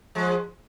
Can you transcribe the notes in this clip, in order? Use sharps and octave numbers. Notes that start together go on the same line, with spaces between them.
F3 G#3